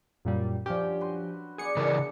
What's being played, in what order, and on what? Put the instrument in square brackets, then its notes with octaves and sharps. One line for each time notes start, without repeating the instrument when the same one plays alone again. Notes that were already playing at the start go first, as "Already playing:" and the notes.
[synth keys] F#2 A#2 G3
[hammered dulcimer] G2 F#3 C#4 [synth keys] F3 G4
[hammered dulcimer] F#4 B4 C6
[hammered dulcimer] F#3 B3 D5 [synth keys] G#4 C#7
[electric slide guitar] C#3 E3 A#4 [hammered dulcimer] D4 E4